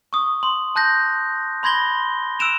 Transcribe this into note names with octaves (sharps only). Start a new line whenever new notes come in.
C#6 D#6
C6
A5 F#6 G6 A#6
B5 C6 G#6 A#6 G7
E6 F#6 D7 E7 F7